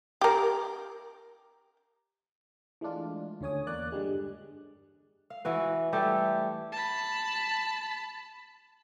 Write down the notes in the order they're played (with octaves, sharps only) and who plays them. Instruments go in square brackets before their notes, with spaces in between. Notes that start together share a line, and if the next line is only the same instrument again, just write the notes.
[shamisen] G4 A#4
[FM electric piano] E3 G#3 A3 D4 F4
D2 D3 C#4 C#5 G#5 D#6
E2 A#3 D5 F#6
G2 D3 G3 G#3
[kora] F5
E3 F#4 B4
G3 A3 E4 G4
[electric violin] A5 B5